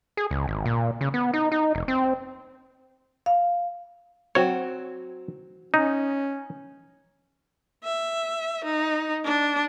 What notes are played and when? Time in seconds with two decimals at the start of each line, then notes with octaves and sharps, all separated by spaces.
0.17 G#4
0.31 C#2
0.48 G#1
0.65 A#2
1.01 C#3
1.14 B3
1.33 D#4
1.52 D#4
1.75 F1
1.88 C4
3.26 F5
4.35 F#3 C4 F#4 C#5
5.74 C#4 D#4
7.84 E5
8.64 D#4
9.25 D4